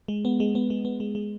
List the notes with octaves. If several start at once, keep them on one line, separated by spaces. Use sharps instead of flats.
G#3
B3
G#3
B3
G#3
B3
G#3
G#3